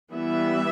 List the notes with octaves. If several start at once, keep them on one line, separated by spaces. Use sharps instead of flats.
E3 G3 B3 E5